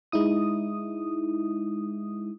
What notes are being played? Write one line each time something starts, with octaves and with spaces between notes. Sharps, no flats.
G#3 D#4 E4 D#6